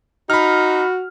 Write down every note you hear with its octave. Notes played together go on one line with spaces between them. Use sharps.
D#4 F#4 B5 F6